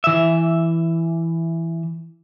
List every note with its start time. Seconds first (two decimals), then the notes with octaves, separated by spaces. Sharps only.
0.04 E3 E5